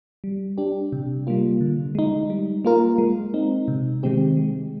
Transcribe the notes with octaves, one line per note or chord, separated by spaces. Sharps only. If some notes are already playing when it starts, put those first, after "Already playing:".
G3
D4 G4
C3
G3 A#3 F4
D3
G#3 D#4
G3
A#3 F4 A#4
G#3
C4 D#4
C3
D#3 G#3 C4 G4
G#3